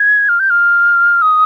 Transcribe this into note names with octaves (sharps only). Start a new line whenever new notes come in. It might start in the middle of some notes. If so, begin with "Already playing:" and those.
Already playing: G#6
F6
G6
F6
D#6